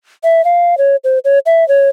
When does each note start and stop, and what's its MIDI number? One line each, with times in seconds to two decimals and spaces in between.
0.24 0.44 76
0.45 0.78 77
0.78 0.96 73
1.04 1.19 72
1.25 1.39 73
1.46 1.67 76
1.68 1.89 73